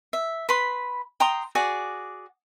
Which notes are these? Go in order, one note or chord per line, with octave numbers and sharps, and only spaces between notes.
E5
B4 B5 C6
G5 A#5 C6 D#6
F#4 G#4 D5